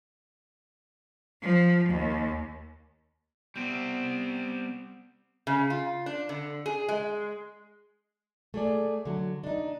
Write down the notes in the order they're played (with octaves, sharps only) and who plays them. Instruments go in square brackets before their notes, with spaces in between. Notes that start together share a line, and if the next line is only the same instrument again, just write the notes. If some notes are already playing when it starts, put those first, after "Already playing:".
[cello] F3
D#2
[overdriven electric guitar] G3 C4 [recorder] B3
[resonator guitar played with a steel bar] C#3
F4
D4
D3
G#4
G#3
[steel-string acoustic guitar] A3 G#4 D5
D3 F#3
D4 D#4